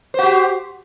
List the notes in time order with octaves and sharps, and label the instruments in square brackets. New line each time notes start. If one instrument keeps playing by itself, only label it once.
[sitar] C5
F#4
G4